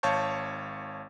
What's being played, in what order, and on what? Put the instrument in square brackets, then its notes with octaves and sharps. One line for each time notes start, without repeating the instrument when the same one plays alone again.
[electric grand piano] G#1 C#5 F5 A5 C#6 G6